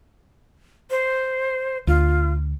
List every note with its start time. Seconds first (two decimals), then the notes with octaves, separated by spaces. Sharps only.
0.90 C5
1.87 D2 F4